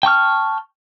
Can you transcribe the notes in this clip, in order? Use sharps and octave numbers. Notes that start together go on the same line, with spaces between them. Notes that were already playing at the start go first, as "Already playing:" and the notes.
G5 A5 C#6 F6